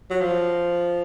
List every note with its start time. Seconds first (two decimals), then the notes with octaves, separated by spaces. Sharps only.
0.10 F#3
0.21 F3